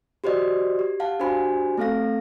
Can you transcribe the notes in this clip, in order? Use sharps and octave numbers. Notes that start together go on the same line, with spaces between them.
F#4 G4 C5 D5 D#5
G4
F5 F#5 A5
D4 F#4 G4 C5 G#5 B5
A3 C4 A4 F5 A#6